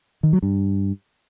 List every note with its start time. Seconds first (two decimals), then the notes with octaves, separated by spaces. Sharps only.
0.23 D#3
0.33 F#3
0.43 G2